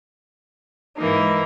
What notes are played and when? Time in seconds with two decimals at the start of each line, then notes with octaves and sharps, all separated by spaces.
0.97 G#2 E3 A#3 D#4